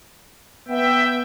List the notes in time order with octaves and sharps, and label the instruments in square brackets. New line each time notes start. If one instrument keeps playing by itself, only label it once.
[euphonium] B3 [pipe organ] E5 G5